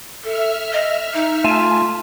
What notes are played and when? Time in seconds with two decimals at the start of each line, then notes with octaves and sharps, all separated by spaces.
0.24 A4 E5 F6
0.73 D#5
1.14 D#4
1.44 A3 F4 G#5 A5